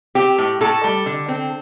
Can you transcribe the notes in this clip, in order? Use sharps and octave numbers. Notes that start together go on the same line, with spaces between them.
C4 G4
A2
A2 A4
G3
D3
C4